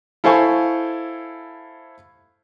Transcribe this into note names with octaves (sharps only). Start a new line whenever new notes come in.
E4 A4 C5 F5 G#5 C#6